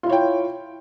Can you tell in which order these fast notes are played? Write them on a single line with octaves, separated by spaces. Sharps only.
F4 E4 C#5 G5